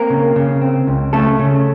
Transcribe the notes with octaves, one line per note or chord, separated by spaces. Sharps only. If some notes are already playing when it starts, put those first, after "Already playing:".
Already playing: A#3 C4 A#4
C#3
C#3
C4
C#2
C#3 A3 A4
C#3